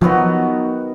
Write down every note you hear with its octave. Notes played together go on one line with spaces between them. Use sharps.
D#3 F3 F#3 B3 F#4